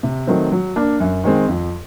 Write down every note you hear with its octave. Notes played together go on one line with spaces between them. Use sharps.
C3
D#3 F#3 A3 C4
F#3
A#3 D4
F#2
D#3 G#3 C4
F2